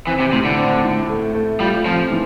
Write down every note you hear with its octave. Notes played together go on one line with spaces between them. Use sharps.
E3 C4
C3
A2 C3
D3
C4
A2
A3
A3
G3 F4
F3 C4
E3